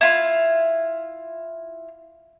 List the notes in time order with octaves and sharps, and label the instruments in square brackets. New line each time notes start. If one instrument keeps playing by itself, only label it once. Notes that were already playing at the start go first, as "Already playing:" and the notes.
[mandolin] E4 F4